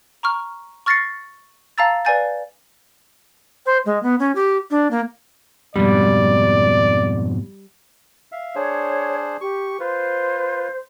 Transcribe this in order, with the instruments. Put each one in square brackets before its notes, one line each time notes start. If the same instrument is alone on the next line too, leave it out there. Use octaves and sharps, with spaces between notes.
[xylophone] A#5 C#6 F6
C#6 F6 A6 A#6 C7 C#7
F5 A5 A#5 E6 A6
B4 D5 F5 G#5 G6 A6
[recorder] C5
G#3
B3
C#4
G4
D4
A#3
[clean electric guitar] F2 G#2 B2 [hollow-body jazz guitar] G3 [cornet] D5
[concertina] E5 F5
[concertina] D4 G#4 C5 [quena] C#5
[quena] G4 [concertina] C#6
[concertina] F4 B4 [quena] C5